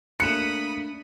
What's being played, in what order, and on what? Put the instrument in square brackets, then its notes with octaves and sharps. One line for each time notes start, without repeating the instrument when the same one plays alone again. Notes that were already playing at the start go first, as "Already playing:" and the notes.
[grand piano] A3 A#3 F#6 [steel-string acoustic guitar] D4 [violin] B5 D#6 [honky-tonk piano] C#7 E7